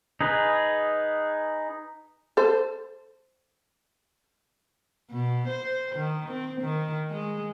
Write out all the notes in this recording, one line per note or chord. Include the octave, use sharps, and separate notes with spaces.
D#4 G#4 B4
A4 C5
B2
C5
D#3
C4
D#3
G#3